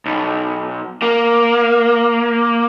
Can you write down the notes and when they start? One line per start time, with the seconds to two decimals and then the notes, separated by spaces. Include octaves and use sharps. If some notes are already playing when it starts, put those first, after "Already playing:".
0.06 B1
1.02 A#3